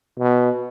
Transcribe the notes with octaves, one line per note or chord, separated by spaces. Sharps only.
B2